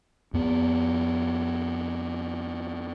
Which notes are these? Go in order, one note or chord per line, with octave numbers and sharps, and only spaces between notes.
F2 B3